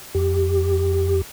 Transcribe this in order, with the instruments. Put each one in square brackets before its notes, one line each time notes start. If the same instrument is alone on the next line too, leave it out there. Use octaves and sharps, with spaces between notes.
[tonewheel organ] F2 G4